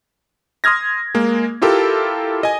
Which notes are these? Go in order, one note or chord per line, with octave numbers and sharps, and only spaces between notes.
C6 D#6 F6 G#6 A#6
G#3 A#3
E4 F4 G4 A4 A#4
D#5 G#5